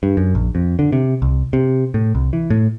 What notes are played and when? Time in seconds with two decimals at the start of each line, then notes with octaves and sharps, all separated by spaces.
0.03 G2
0.17 F#2
0.35 A#1
0.55 F2
0.79 D3
0.92 C3
1.22 C2
1.53 C3
1.94 A2
2.15 C2
2.33 E3
2.50 A2